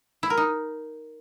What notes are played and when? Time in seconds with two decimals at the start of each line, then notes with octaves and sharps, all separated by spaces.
0.23 E4
0.30 A#4
0.37 D#4